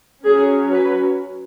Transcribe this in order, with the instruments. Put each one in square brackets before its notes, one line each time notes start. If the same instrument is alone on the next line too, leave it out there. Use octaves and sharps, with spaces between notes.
[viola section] F#3 C#4 G#4
B4